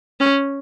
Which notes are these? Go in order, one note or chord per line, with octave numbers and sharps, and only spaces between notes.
C#4